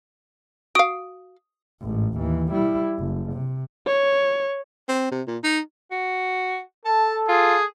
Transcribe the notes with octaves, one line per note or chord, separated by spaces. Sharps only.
F#4 F5 D#6 D7
A1 G#2
D#2 E3
G3 E4
F#1
C3
C#5
C4
C3
A#2
D#4
F#4
A4 A5
F4 G#4